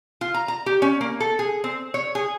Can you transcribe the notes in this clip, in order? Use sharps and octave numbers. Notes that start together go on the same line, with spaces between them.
F4
A#5
A#5
G4
C#4
A#3
A4
G#4
C4
C#5
G#4